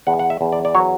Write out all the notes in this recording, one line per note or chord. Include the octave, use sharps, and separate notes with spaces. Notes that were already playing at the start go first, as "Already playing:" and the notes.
E2 F#5
F#5
E5
E2
D5
D5
F#3 C#5